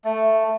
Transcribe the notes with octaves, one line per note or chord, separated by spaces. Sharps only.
A3